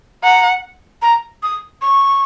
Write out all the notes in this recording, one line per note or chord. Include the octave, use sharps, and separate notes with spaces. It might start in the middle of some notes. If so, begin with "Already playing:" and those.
F#5 A#5
A#5
D#6
C#6